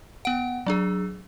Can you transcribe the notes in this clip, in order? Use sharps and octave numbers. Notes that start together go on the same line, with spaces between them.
B3 F#5
F#3 D4 G#4